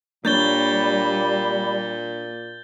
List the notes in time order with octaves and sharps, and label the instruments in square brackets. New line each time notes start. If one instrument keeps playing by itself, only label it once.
[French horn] A#2 [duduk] G3 [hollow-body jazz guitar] A#3 D4 C#5 [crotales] G6 A6 G7